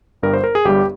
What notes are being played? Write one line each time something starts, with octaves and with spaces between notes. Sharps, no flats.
G1 G2 G3 A#4
C5
A#4
G#4
G1 G2 G3 G4